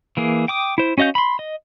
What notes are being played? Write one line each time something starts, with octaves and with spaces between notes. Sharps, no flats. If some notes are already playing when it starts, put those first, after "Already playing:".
E3 A#3 G#4
G5 D6 D#6
E4 C5
C#4 F#4 D#5 F5 G6
B5 C6
D#5